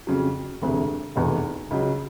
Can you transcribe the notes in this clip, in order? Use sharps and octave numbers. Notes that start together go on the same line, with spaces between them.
F2 C#3 F#3
E1 D2 C3
F1 E2 B2
C#2 C#3 F#3